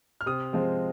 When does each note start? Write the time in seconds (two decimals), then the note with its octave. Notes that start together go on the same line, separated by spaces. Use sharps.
0.21 F6
0.26 C3 D#6
0.53 F3 G#3 C4